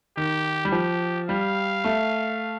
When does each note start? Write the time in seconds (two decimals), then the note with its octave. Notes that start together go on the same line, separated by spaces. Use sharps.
0.17 D#3 G4
0.65 G3
0.72 F3 G4
1.28 G3 F5
1.84 A3